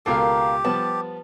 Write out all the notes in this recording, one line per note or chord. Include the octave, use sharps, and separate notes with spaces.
C#2 B2 A#3 G4 A4 A#4 F5
F3 G3 B3 A5